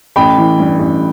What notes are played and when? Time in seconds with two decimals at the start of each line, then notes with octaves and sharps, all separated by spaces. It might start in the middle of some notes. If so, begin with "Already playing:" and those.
0.16 A1 G5 B5
0.38 E3
0.59 G2
0.80 A1